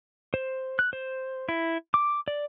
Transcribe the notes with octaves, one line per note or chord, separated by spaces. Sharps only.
C5
F#6
C5
E4
D6
D5